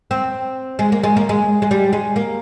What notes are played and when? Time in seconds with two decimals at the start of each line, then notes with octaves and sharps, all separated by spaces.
0.11 C4
0.79 G#3
0.92 A#3
1.04 G#3
1.17 A#3
1.29 G#3
1.62 G#3
1.71 G3
1.93 G#3
2.16 A#3